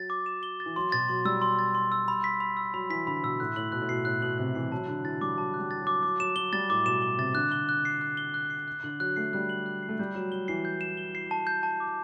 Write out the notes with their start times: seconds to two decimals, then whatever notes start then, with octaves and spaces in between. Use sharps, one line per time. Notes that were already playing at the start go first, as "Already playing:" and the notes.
Already playing: F#3 A6
0.10 D6
0.26 E7
0.43 G7
0.60 A6
0.66 E3
0.76 F#3 C6
0.92 B2 A6
1.08 F#3 C6
1.25 G3 E6
1.42 C6
1.59 A6
1.75 C6
1.92 E6
2.08 B5
2.24 B6
2.40 B5
2.57 E6
2.74 F#3 B5
2.90 E3 B6
3.07 D3 B5
3.23 B2 E6
3.40 A2 F#6
3.56 A2 F#7
3.72 B2 F#6
3.82 A2
3.89 B2 C7
4.05 A2 F#6
4.22 B2 F#7
4.38 C3 F#6
4.55 E3 C7
4.72 F#3 A5
4.88 D3 F#6
5.04 E3 A6
5.21 G3 D6
5.37 F#3 A5
5.54 F#6
5.59 G3
5.71 A6
5.81 F#3
5.87 D6
6.03 F#3 D6
6.20 F#3 E7
6.36 F#3 G7
6.53 G3 A6
6.70 A2 D6
6.86 B2 E7
7.02 G7
7.18 C3 A6
7.35 D3 F#6
7.52 G7
7.69 F#6
7.85 C7
8.01 F#6
8.17 G7
8.34 F#6
8.50 C7
8.68 F#6
8.84 D3 F#7
9.00 F#3 F#6
9.16 A3 C7
9.33 G3 F#6
9.49 F#7
9.66 F#6
9.83 C7
9.89 A3
9.99 G3 G6
10.15 F#3 E7
10.32 F#3 G7
10.48 E3 C7
10.65 G6
10.81 E7
10.97 G7
11.15 C7
11.31 A5
11.47 G6
11.63 A5
11.80 D6